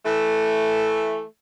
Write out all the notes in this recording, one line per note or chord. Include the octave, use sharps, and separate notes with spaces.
E3 A3